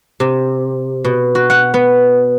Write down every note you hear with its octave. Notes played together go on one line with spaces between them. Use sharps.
C3
B2
F#4
F#5
B3